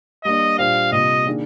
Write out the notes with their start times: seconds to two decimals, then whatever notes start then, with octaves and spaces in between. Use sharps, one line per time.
0.24 G3 A#3 D4 D#5
0.58 A#2 G3 D4 G4 C5 F5
0.92 C3 G3 A#3 F4 D#5
1.26 D#3 A#3 D4 G#4